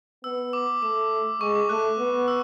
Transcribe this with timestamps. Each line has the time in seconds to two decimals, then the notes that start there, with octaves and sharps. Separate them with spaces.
0.24 B3 E6
0.53 D6
0.82 A3 D6
1.41 G#3 C#6
1.55 D6
1.69 A3 F#6
1.99 B3
2.28 E6